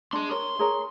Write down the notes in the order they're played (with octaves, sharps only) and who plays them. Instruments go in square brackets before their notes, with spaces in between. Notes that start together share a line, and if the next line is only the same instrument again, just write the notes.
[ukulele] D4 [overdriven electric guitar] G#4 C6
[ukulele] A#4 C#5 [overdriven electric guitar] C6
[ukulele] G#4 A#4 C#5